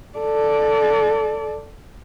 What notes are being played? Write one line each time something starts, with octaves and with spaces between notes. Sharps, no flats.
A4 D5